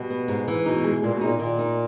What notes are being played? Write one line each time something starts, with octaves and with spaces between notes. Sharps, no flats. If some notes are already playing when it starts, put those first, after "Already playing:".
Already playing: B2 G3
B3
G#2
E3
B2 D#4
G#3
A#2 G#3
B2
A#2 D#4
A#2 D#3
D#4